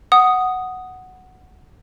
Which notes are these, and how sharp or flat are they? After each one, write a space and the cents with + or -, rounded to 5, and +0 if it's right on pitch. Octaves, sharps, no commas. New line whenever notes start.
F#5 +0 D#6 +0